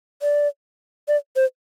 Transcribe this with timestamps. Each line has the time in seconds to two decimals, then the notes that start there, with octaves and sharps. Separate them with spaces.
0.22 D5
1.08 D5
1.36 C5